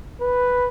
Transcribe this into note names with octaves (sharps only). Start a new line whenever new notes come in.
B4